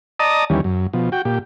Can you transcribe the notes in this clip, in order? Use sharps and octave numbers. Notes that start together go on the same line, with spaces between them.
D5 D#5 A5 A#5 D#6
D#2 E3 G3 C#4
F#2
B2 F3
F#4 G5
A#2 G4